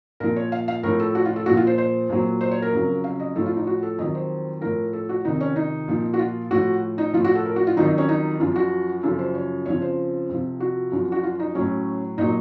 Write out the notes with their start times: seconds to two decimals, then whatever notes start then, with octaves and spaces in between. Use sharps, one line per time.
0.20 A#2 F3 A#4
0.36 C#5
0.52 F5
0.68 F5
0.83 A2 F3 A#4
1.00 A4
1.15 F#4
1.25 F4
1.36 A4
1.46 A#2 F3 F#4
1.57 F4
1.67 C5
1.78 C5
2.10 A#2 F#3
2.41 C5
2.51 C#5
2.62 A#4
2.72 F2 C#3 F#3
3.04 F5
3.20 D#5
3.36 A2 F3 A4
3.46 F4
3.56 D#4
3.67 F#4
3.83 A4
3.98 F2 D#3 F#3 D#5
4.15 C5
4.61 A2 F3 A#4
4.93 A4
5.09 F#4
5.24 F2 C3 D#3 D#4
5.40 C#4
5.56 D#4
5.88 A#2 F3
6.14 F#4
6.19 F4
6.51 A2 F3 F#4
6.98 D#4
7.14 F3 F4
7.17 A2
7.24 F#4
7.35 A4
7.45 A#4
7.56 F#4
7.67 F4
7.77 F2 D#3 F#3 D#4
7.88 D#4
7.98 C#4
8.09 D#4
8.40 F#2 F3 F4
8.56 F#4
9.03 F#2 C#3 F3 A4
9.19 C5
9.35 C#5
9.66 F2 C#3 F3 C#5
9.82 C5
10.29 F2 C3 F3
10.60 F#4
10.92 F#2 F3
11.12 F#4
11.23 F4
11.40 D#4
11.55 A2 F#3 C#4
12.18 A#2 F#3 D#4